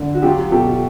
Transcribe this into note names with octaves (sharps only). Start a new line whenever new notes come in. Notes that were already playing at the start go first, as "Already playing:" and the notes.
Already playing: D3
F#4
F#3 F4 G4
B2 G4 A4